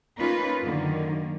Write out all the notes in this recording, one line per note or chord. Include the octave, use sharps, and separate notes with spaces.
A#3 C#4 D#4 F4 B4
F#2 D3 D#3 A#3